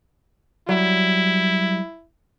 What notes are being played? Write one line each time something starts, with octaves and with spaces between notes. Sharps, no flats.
F#3 G3 E4